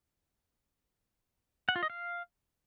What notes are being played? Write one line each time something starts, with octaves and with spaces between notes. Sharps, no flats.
F#5
F4
D#5
F5